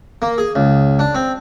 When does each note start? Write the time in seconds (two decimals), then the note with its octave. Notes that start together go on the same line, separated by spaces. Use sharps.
0.22 A#3
0.38 G#4
0.55 C#2
0.99 D4
1.15 C4